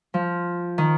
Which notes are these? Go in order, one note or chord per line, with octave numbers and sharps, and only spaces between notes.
F3
D#3